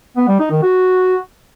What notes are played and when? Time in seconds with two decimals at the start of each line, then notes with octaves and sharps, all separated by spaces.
0.17 B3
0.28 G3
0.40 D#4
0.51 D#3
0.63 F#4